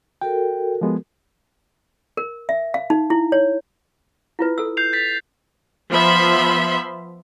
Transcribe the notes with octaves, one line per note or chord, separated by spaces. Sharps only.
F#4 A4 A#4 G5
F3 G#3 B3
A#4
E5
F5
D#4
E4
C#5
E4 F4 B4
A4 E6
G6 C7 F7
A6 B6
F3 B3 E5 B5 C6